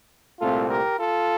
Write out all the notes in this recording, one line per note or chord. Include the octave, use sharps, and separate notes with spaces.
C2 A#2 A3 C4 F4 A4
G4 A#4
F4 A4